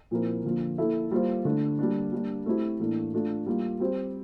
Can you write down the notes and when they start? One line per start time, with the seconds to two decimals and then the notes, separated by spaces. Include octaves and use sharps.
0.11 A#2 F3 C4 E4 A#4
0.45 D3 F3 A#3 F4
0.78 A#3 E4 A4 E5
1.11 G3 A#3 F4 C5
1.45 D3 A3 D4
1.79 G3 A#3 D4
2.12 G3 A#3 D4
2.46 A3 C4 E4 G4
2.79 A2 E3 A#3 D4
3.13 A3 D4 F4 A4
3.46 G3 A#3 F4
3.80 G3 C4 G4